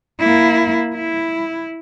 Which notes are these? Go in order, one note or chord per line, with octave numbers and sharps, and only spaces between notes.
A#3 E4
E4